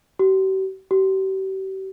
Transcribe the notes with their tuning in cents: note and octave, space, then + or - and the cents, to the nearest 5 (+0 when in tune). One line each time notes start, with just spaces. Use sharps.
G4 -45
G4 -40